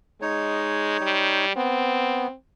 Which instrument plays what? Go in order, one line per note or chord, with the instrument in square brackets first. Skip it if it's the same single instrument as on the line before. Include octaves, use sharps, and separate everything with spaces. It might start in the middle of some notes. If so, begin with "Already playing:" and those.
[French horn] G#3 [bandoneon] D#4 C#5
[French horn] G3
[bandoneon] B3 [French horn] C4